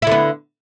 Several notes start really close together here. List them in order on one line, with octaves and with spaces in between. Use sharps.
E4 D3 B3